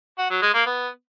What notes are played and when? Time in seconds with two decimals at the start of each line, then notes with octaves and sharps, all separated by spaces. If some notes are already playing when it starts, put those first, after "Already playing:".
0.19 F#4
0.30 F#3
0.42 G#3
0.54 A#3
0.66 B3